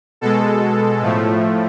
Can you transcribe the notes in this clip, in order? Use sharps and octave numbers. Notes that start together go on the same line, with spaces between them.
B2 G#3 A4
A2 F3 A3